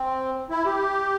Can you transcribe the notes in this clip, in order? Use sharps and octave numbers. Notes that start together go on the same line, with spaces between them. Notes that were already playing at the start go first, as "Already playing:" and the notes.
Already playing: C4
E4
G4